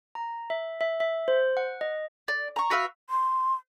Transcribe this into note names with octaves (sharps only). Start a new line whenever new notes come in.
A#5
E5
E5
E5
C5
F#5
D#5
D5
A#5 C#6
F#4 B4 E5 F5
C6